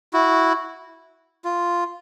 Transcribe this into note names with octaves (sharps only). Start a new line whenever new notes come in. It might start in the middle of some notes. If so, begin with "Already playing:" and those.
E4 F#4
F4